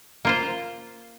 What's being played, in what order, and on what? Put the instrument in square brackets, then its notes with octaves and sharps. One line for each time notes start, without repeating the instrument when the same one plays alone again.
[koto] A#3 F4 C5